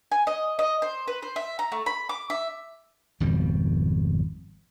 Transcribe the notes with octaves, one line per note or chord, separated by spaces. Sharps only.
G#5
D#5
D#5
C5
B4
C5
E5
A#5
A3
B5
D6
E5
G#1 F2 B2 G3